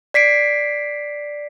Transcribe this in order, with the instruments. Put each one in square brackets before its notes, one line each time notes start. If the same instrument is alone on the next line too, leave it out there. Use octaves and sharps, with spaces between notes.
[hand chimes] D5 B6 C7 D7